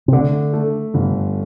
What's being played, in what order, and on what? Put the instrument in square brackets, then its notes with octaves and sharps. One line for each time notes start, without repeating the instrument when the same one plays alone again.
[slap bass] C3
[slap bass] D3 [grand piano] A3
[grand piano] A3
G1